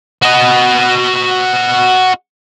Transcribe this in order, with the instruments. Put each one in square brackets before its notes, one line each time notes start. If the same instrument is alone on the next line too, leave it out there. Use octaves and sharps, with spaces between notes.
[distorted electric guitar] F#4 D#5